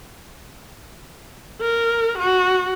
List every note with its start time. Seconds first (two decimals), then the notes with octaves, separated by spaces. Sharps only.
1.61 A#4
2.19 F#4